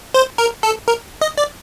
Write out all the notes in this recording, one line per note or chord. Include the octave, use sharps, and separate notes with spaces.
C5
A#4
A4
A#4
D#5
D5